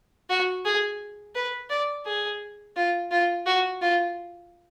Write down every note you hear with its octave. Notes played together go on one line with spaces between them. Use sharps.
F#4
G#4
B4
D5
G#4
F4
F4
F#4
F4